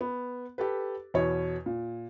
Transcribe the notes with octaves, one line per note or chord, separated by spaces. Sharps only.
B3
G4 A4 B4
E2 B2 C#5
A#2